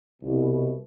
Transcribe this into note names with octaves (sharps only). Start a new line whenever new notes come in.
C2 B2